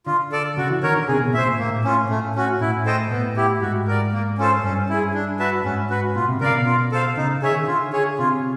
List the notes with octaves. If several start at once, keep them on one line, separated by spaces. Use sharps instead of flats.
D3 F4
A4 D5
C#3 F#4
E3
D#3 A#4 C#5
D3
C3 G#4
B2
A#2 C5 E5
A#2
A2 A#3
C#4 F4
A2 A3
C#4 F#4
A2 E4
A4 C5 D#5 G5
A2 B3
E4 G4
G#2 F#4
A#4 D5
A#3
C#4 F4 A4 C5
G2 C#4
E4 G#4
D4
F#4 B4 E5 A5
G#2 C#4
F#4 B4
A#2 F4
C3
C#3 A#4 D5 F5
B2
F4
A4 C5 F5
C#3 D#4
G#4 C#5 E5
D#3
D3 F4
G#4 C#5
C3 F4